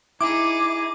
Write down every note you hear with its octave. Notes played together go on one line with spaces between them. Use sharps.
D#4 E4 G#4 D6